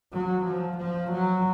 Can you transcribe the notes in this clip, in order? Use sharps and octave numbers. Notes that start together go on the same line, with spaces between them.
F#3
F3
F3
F#3